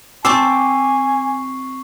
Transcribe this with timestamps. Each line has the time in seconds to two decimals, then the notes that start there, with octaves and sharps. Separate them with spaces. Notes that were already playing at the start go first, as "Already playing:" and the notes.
0.25 C4 C5 G#5 A5 C#6 D6 E6 C7